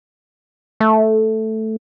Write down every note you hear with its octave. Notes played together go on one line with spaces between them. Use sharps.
A3